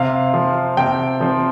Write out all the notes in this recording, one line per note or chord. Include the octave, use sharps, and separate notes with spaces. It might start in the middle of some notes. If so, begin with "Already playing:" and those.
Already playing: C3 F5
F3 C4
C3 G5
F3 C4